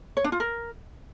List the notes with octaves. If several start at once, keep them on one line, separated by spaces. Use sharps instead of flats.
C#5
D4
F4
A#4